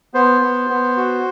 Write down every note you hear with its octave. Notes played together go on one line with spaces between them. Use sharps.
B3 C5
B3
B3
F#4